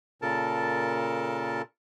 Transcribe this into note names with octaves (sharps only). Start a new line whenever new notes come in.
A#2 C#3 A4 A#4 A5